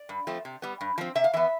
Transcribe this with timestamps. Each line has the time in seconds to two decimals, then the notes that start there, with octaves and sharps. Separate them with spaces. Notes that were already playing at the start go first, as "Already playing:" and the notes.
Already playing: D5
0.09 G2
0.27 F3 A3 C4
0.45 C3
0.62 G3 B3
0.81 G2
0.98 F3 C4
1.15 C3 E5
1.24 F5
1.33 E3 B3 E5